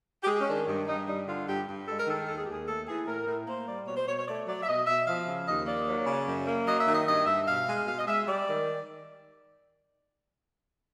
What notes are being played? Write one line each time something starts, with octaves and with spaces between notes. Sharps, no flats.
G4
G#3 G#4
C#4
D#3 D4
G2
G2 D#4
G3 D#4
D3 F4
G2 G4
G2
G#3 A4
A#4
D#3 A4
D#2 A4
G#4
G4
D#2 G#4
A3 A4
E3 G#4
A2 A#4
A2
A#3 C5
G3 D5
B2 C#5
C5
B2 C#5
C#5
A3 D5
F#3 D5
E5
B2 D#5
B2 E5
F3 F5
C#3
D#2 D#5
A#3 D5
F#3
C#3
F#2
A#3
F#3 D#5
E5
D#3
D#5
G2 D#5
G2 E5
B2 F5
G#3
B2 F5
D#5
G#3 E5
G3 D5
D#3